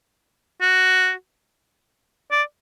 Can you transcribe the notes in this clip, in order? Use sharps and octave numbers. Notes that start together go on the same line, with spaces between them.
F#4
D5